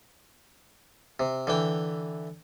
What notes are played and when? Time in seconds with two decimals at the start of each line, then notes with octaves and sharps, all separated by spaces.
1.20 C3
1.47 D3 E3 G5